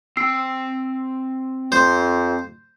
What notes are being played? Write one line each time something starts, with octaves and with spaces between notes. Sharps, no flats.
C4 G5 E6 C7
F2 C5